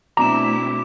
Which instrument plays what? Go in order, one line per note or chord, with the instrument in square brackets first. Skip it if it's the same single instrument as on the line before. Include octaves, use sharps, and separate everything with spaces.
[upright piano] B2 D4 [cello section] A3 C4 E4 [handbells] A#5 [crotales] D6 E7